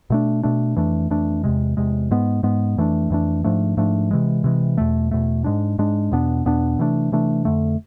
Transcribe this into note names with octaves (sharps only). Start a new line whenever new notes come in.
B2 A3 D4
B2 A3 D4
F2 E3 A3 D4
F2 E3 A3 D4
E2 C3 G#3
E2 C3 G#3
G#2 G#3 B3
G#2 G#3 B3
F2 E3 A3 D4
F2 E3 A3 D4
G#2 F3 A3 D4
G#2 F3 A3 D4
C3 E3 G#3
C3 E3 G#3
E2 B2 A3
E2 B2 A3
G#2 G#3 D4
G#2 G#3 D4
E2 B2 B3 D4
E2 B2 B3 D4
C3 E3 A3 D4
C3 E3 A3 D4
F2 D3 A3